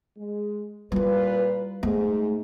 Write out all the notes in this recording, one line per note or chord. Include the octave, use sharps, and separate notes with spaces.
G#3
A#2 G3 E4 F4 B4
G#2 A3 G#4